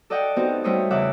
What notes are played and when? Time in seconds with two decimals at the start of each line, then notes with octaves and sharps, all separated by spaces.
0.10 A4 D5 D#5 F#5 G5
0.36 B3 C4 D#4 F#4 G4
0.64 G3 A3 E4 C5 C#5 D#5
0.91 E2 C#3 E5 F#5 D6